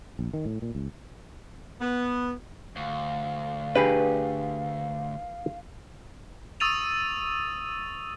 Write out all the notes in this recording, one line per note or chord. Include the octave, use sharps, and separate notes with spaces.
A#1
D#3
A2
A#2
C#2
B3
D2 F5
D4 G4 G#4 B4
C#6 D#6 E6 A6 D#7 F7